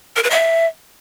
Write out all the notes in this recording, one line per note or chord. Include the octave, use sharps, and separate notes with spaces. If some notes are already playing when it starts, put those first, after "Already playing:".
A#4
B4
E5